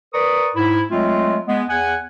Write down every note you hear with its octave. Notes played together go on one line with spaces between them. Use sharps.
A#4 B4 D5 A#5 C#6 D#6
G#2 E4
F#3 G#3 A3 C4 F4
G#3 B3
E2 F#5 G#5